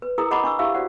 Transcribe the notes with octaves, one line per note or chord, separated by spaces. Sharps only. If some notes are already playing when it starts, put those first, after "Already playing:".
B4
E4 G#4 A#4 A#5 D#6
G#4 D#5 F#5 A#5 B5 D6
D4 C#6 E6
E4 G4 E5 F5 E6
F#4 C5 D5 F#5